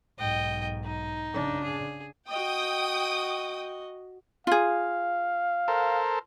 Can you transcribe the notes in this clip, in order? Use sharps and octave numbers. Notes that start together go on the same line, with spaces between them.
B1 G#2 D#5 G5
D#4
C#3 D4
G#4
F#4 D#5 G5 D#6
F4 G#4 F5
A4 A#4 C5